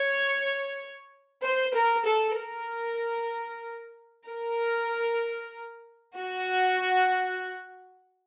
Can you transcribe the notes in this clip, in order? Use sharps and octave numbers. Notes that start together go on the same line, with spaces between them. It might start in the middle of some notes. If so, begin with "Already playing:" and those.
Already playing: C#5
C5
A#4
A4
A#4
A#4
F#4